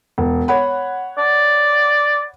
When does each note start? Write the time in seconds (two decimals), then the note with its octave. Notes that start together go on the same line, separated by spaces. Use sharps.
0.18 E1
0.48 C#5 F#5 B5
1.18 D5